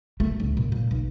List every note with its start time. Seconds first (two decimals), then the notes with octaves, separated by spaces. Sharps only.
0.20 A3
0.40 C#2
0.57 A#2
0.72 A#2
0.91 B1